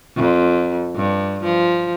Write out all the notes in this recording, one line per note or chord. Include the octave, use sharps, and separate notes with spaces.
F2
G2
F3